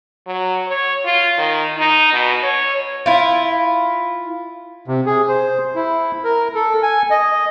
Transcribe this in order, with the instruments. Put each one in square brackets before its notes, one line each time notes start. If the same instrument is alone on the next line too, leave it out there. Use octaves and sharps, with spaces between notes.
[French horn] F#3
C#5
F4
D#3
D#4
B2
C#5
[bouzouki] E4 F4
[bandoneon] C3
G#4
C5
E4
A#4
A4
G#5
D#5